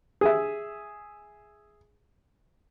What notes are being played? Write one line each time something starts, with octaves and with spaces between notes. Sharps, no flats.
G#4 E5